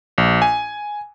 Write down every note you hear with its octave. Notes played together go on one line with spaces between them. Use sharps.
A#1
G#5